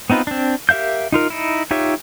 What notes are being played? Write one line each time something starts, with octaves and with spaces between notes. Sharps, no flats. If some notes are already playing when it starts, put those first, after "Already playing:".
B3 C4 D#4 F4 B4
C4 D4
G4 A#4 E5 F5 G6
D#4 F4 A#4
D#4 E4
D#4 F4 G4 C#5 E5